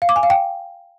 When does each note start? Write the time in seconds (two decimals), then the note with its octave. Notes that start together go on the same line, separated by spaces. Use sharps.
0.02 F5
0.09 D6
0.16 G#5
0.23 F5
0.30 G5